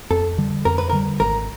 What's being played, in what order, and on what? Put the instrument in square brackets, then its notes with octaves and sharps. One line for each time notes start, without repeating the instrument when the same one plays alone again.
[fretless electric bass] F2 [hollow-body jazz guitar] A4
[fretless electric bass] D3 G3
[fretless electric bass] F2 [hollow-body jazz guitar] A#4
[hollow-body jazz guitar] B4
[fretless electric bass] D3 G3 [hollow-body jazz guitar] A#4
[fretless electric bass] G#1 [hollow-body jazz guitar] A#4